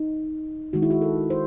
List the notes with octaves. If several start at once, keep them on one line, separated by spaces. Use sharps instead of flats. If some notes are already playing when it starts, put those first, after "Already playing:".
Already playing: D#4
D#3 G#3 F#4
E4
F#4
A4
C5